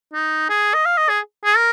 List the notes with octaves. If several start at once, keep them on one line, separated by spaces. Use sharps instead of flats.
D#4
G#4
D#5
F5
D#5
G#4
G#4
A#4